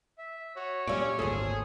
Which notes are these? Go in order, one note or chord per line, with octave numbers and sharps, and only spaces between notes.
E5
F#4 C#5
A#2 G3 C#4 D5 E5
G#1 D2 A#2 G#4 A4 C5